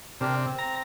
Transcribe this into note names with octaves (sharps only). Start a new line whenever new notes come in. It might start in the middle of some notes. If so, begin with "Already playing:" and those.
C3 D4 G4 A#4
C4
A#5